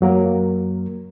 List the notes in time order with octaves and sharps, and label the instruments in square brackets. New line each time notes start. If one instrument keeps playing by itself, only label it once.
[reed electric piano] F#2 F#3 A#3 A#4